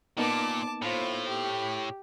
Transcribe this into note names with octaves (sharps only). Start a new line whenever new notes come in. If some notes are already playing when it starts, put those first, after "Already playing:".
A#2 A#3 B3 D#4 A5 D6
A2 F4 C5
G4